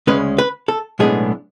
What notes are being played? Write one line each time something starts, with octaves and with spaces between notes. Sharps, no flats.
D2 C#3 G#3 C#4 B4
B4
A4
B1 A2 G#3 B3 D4 G#4